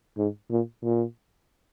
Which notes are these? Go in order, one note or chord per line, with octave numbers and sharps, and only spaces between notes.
G#2
A#2
A#2